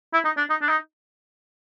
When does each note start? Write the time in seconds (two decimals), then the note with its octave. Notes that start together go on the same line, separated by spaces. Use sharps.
0.13 E4
0.25 D#4
0.37 D4
0.50 D#4
0.62 D4
0.69 D#4